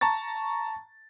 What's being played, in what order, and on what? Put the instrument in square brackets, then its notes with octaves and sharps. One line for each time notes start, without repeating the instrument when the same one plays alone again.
[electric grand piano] A5 A#5 C#6 A6